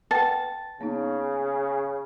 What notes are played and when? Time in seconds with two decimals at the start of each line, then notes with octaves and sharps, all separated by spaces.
0.11 B4 F#5 G5 A5
0.81 C#3 A#3 B3 D#4